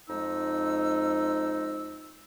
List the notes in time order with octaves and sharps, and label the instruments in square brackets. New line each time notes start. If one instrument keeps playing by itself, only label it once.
[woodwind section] F2 G#3 D#4 E6